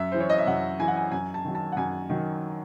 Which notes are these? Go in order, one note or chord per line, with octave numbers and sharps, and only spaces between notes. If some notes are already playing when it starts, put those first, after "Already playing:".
Already playing: F#2 E5
E3 C5
C#5
D#5
E5
F#2 F#5
E3 G#5
F#5
G#5
F#2 G#5
A5
D#3 F#3
A5
F#5
F#2 G#5
D#3 F#3